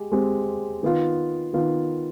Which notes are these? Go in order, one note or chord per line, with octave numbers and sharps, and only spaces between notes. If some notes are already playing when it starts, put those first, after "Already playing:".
Already playing: G#3 G4
G#3 C4 G4
D#3 B3 F4
D#3 B3 F4